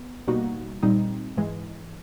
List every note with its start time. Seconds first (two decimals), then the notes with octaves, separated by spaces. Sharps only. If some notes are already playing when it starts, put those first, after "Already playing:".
Already playing: B3
0.27 B2 G3 A#3 D#4 F#4
0.83 A#2 G3 C4 D#4
1.37 G#2 E3 G#3